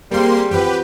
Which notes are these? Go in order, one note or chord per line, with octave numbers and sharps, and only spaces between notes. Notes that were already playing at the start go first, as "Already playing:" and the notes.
G3 G#3 A#3 C4 C6
F3 C4 F#4 G4 B4